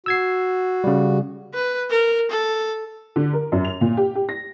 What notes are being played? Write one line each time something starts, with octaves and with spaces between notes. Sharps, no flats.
F#4 E6 G#6 C7
C#3 G3
B4
A#4
A4
D3
A#4
F#2
F7
A#2
G4
G4
A#6